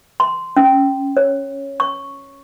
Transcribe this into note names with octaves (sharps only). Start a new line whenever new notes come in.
C6
C#4
C#5
C#6